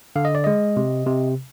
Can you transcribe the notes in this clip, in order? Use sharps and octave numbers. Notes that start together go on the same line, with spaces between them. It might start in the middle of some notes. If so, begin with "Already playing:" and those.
D3 F5
D#5
D5
G#3 D#5
C3
C3